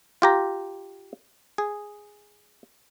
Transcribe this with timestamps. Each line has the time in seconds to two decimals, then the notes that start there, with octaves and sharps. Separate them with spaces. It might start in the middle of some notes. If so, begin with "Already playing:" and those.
0.22 F4 G4 A#5
1.58 G#4